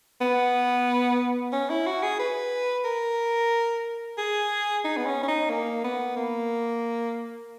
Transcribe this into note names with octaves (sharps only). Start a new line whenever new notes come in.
B3
C#4
E4
F#4
G#4
B4
A#4
G#4
D#4
B3
C#4
C#4
D#4
A#3
B3
A#3